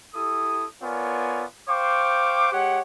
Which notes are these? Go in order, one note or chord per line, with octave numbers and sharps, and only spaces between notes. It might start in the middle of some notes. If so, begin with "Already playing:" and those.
E4 G4 A4 D#6
B3 F4 A#4 C#5 D5 G#5
C5 F5 G5 C#6 D6
G#3 G4 C#5 F#5